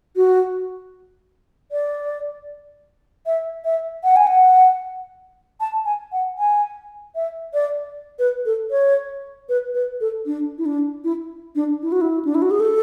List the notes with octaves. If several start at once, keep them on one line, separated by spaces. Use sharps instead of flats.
F#4
D5
E5
E5
F#5
G#5
F#5
A5
G#5
F#5
G#5
E5
D5
B4
A4
C#5
B4
B4
A4
D4
E4
D4
E4
D4
E4
F#4
E4
D4
E4
F#4
G#4
A4